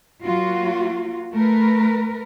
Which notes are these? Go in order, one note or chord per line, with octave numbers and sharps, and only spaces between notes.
F#3 A#3 F4 F#4
A3 A#4 B4